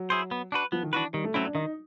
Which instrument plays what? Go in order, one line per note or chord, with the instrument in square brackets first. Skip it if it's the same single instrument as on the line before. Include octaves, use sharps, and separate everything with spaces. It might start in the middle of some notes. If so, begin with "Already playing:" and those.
Already playing: [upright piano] F#3
[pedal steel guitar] E4 G#4 C5
B3
D4 F#4 B4
[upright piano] F3 [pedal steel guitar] B3
[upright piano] D#3
[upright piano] E3 [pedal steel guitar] D4 F#4 B4
[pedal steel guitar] D#3 [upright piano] G3
[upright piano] A3
[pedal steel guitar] F#3 A3 C4 E4 [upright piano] C#4
[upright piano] D4
[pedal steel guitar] D#3 [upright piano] D#4